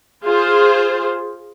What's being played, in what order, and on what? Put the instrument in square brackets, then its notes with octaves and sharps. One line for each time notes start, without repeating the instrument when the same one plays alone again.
[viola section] F4 G#4 C5